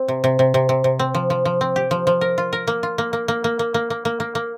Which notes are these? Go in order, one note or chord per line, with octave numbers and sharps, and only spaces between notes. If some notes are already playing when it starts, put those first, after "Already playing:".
Already playing: C4
C3
C3
C3
C3
C3
C3
C4
F3
F3
F3
C4
G4
F3
F3
A#4
F4
A#4
A#3
F4
A#3
A#3
A#3
A#3
A#3
A#3
A#3
A#3
A#3
A#3